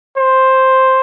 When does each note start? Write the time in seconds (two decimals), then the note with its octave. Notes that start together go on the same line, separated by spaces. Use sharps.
0.18 C5